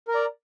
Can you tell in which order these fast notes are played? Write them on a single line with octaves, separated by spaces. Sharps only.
A#4 A#5 D5